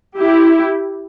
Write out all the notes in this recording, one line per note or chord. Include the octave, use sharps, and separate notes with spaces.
E4 G4